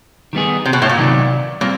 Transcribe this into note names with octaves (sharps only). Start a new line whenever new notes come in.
D#3 G3 B3 D#4 G#4
C3
B2
A2
A#2
C3 D#3 F#3 B3 D#4
A#2 G3 C4